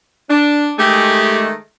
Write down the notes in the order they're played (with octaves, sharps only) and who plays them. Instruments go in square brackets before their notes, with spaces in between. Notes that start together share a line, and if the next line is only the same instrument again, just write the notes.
[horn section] D4
[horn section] D#3 G#3 A3 [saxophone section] G4 G#4